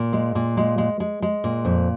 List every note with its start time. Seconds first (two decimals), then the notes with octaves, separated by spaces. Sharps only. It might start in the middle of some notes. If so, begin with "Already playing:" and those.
Already playing: A#2
0.13 G#3
0.35 A#2
0.57 G#3
0.78 G#3
1.00 G#3
1.22 G#3
1.44 A#2
1.65 F2